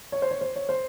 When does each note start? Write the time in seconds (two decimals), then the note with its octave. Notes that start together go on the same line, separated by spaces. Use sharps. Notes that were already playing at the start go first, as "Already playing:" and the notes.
0.12 C#5
0.22 C5
0.31 C#5
0.41 C5
0.56 C#5
0.69 C5